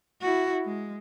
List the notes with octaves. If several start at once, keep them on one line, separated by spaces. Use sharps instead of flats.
E4 F#4
G#3